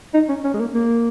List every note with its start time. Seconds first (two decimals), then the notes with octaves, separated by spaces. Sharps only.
0.14 D#4
0.29 C#4
0.44 C#4
0.54 G#3
0.60 A#3
0.74 A#3